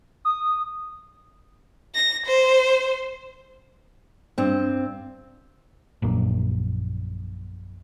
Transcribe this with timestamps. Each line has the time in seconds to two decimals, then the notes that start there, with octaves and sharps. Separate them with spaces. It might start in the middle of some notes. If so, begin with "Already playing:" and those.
0.25 D#6
1.95 A#6
2.26 C5
4.38 G2 C4
6.02 A#1 F#2 A#2